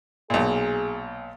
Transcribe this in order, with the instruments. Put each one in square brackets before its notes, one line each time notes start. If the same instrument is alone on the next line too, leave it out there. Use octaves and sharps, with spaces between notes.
[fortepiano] B1 A#2 [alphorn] G#4